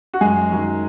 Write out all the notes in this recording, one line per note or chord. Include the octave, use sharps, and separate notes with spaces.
F#4
F#2 G#3 G#4
D#3 F#3